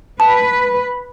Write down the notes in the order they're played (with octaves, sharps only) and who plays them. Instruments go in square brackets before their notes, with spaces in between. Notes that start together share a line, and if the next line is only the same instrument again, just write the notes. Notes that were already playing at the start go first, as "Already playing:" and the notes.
[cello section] B4 [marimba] A5